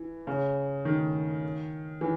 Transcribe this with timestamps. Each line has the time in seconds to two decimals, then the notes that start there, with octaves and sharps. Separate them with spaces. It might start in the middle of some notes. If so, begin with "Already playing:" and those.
Already playing: E3
0.27 C#3
0.85 D#3
2.01 E3